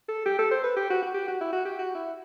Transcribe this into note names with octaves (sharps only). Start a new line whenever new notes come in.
A4
G4
A4
C5
B4
G4
F#4
F#4
G4
F#4
E4
F#4
G4
F#4
E4